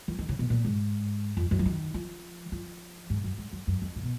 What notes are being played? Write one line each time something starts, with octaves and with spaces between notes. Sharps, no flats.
F3
D#3
C#3
B2
A#2
G#2
F2
F#2
F3
D#3
F3
F3
G#2
F#2
G#2
F#2
F#2
F2
A#2
B2